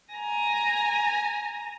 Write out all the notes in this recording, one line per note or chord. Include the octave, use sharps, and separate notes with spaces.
G#5 A#5